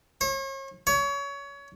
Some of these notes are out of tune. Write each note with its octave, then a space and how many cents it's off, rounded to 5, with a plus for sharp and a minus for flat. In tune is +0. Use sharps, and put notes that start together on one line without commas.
C#5 -40
C#5 +25